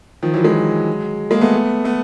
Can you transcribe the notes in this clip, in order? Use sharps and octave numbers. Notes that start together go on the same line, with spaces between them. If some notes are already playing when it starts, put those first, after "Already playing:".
D#3 F3
E3 F#3
F#3 G#3
G#3 A#3
A3 B3
A3 B3